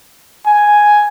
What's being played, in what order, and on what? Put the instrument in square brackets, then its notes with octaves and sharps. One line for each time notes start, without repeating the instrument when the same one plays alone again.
[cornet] G#5